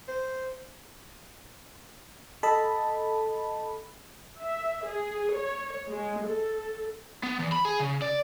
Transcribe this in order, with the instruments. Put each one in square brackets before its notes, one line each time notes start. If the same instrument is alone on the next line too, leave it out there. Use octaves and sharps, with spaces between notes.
[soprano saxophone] C5
[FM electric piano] A4 D#5 A5 B5
[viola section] E5
G#4
C#5
G#3
A4
[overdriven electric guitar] B3
E2
B5
G#4
C#3
D5